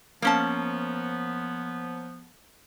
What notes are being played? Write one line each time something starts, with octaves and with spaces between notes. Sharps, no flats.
F3 A#3 B3 C#4 A5